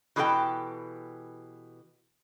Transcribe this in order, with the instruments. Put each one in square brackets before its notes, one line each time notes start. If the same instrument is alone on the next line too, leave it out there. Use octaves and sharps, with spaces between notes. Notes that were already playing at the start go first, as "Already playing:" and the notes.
[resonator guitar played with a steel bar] B2 E3 G4 A4 A#4 G5